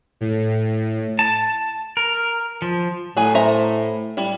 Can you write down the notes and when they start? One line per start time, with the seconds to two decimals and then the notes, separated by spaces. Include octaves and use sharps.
0.21 A2
1.19 A5
1.97 A#4
2.62 F3
3.16 A2 F#3 G#4 G#5
3.35 C5 E5 A#5
4.17 G3 E4